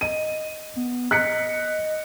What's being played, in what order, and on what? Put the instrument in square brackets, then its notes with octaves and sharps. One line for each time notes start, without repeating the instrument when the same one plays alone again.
[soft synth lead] D#5 [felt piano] D#7
[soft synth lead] B3
[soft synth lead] D#5 [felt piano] F#6 B6 C#7